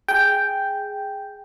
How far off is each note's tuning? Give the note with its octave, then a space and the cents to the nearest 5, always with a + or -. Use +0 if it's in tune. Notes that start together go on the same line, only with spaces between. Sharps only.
G#4 +0 G5 +0